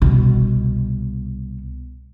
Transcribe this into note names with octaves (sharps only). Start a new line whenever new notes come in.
C2 B2